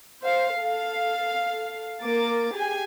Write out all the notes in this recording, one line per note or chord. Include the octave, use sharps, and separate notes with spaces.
C5 F5
A4 F5
A#3 A#4 D6 A6
G4 G#4 G#5